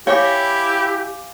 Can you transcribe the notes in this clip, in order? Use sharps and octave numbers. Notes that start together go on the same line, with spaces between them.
E4 G4 C#5 F5 G#5 D6